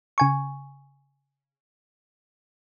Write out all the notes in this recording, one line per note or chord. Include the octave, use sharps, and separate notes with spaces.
C#3 G#5 C#6